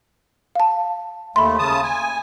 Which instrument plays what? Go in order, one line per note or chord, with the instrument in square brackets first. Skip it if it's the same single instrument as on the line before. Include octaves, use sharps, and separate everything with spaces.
[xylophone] F5 A5
[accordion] D#2 A3 [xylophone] B5 C6
[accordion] C#3 A5 D#6
G#5